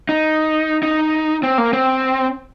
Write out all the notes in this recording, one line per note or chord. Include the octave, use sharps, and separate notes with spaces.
D#4
D#4
C4
A#3
C4